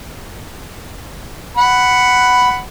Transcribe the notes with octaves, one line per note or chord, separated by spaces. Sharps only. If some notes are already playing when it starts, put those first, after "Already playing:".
F#5 B5